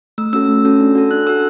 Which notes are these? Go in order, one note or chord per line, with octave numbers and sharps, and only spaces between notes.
A3 E6
C#4 F#4 A4 E6
A3
C#4 F#4 A4
D4
F#4 A4
D4 F#6
F#4 A4 E6